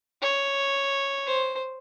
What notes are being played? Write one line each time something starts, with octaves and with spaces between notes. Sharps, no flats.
C#5
C5